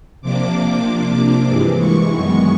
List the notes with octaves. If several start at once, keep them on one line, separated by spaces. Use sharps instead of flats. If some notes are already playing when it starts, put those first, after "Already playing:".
C3 F3 A#3 D4 D6
C3 F3 A#3 D4 D6
G2 E3 G#3
C#6
F#2 D#3 G#3 B3 C#6